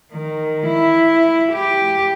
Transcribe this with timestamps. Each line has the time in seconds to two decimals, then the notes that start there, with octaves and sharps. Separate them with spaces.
0.12 D#3
0.66 E4
1.52 G4